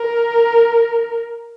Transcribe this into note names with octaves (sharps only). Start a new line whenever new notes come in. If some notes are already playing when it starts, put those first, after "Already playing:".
Already playing: A#4